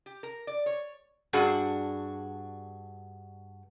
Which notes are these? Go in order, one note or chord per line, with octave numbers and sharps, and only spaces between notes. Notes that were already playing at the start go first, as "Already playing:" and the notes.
G4
A#4
D5
C#5
G2 D4 F#4 G#4